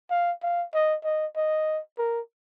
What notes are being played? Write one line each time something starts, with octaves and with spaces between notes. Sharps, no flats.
F5
F5
D#5
D#5
D#5
A#4